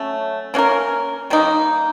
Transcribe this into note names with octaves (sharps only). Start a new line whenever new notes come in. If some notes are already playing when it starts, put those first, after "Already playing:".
Already playing: F#3 A3 C#4
A#3 C#4 F#4 A#4
D#3 G3 A#3 D#4